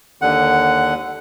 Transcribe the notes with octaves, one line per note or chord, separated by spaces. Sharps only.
D#2 D3 F#5